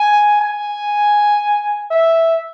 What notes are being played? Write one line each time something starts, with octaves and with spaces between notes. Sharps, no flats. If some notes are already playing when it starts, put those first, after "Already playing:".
Already playing: G#5
G#5
E5